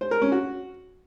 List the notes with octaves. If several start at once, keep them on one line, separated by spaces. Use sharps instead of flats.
C5
A#4
C#4
F#4